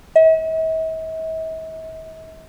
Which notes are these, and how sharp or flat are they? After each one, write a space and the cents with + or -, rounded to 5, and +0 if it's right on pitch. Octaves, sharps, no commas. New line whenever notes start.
E5 -45